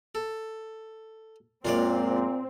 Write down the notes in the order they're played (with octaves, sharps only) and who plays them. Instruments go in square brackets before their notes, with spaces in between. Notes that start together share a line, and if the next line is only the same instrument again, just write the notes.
[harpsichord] A4
[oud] F#2 G#3 A#3 [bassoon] A#2 [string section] C4 [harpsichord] F4 C#5 D5